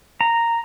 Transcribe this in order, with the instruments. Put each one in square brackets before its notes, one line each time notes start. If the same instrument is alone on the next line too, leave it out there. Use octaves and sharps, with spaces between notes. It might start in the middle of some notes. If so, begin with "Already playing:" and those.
[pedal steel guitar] A#5